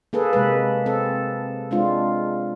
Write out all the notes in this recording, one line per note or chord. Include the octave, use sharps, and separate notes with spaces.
A#3 G#4 A4 B4
C3 G#3 B4
C4 A4
G#3 C4 D4 F4